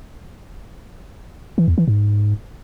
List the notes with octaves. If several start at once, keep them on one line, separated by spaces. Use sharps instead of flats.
E3
E2
E3
G#2